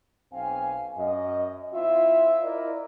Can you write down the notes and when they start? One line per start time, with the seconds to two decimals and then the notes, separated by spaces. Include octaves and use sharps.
0.33 B1 C4 F5 G#5
0.97 F#2 D#5
1.73 C4 E4 F4 E5
2.43 E4 A#4 D5 D#5